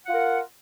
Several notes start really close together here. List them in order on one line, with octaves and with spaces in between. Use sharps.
F#5 F4 A#4